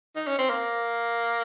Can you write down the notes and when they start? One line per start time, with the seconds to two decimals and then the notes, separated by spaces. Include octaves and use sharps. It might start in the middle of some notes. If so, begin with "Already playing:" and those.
0.16 D#4
0.27 C#4
0.39 C4
0.50 A#3